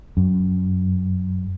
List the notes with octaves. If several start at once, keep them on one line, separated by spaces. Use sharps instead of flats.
F#2